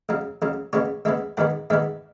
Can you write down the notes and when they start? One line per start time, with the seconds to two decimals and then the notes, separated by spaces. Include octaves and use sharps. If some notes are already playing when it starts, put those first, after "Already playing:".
0.09 C#2 C#3 F#3
0.42 C#2 C#3 F#3
0.73 C#2 C#3 G#3 B3 C#5
1.05 C#2 C#3 G#3 B3 E5
1.37 G#2 D#3 G#3 B3 F#5
1.70 G#2 D#3 G#3 B3 E5